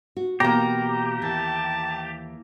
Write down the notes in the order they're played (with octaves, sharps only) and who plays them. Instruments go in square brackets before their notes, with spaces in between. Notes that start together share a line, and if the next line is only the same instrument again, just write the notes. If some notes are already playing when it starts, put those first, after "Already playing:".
[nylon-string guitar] F#4
[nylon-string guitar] B2 E3 [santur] A#3 A#5 [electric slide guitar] G4
[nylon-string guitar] D#2 E3 [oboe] A5